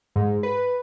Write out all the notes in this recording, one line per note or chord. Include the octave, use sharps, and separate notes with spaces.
G#2
B4